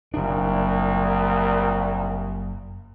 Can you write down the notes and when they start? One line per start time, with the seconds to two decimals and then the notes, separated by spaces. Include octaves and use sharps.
0.14 F#1 C2 A#2 D4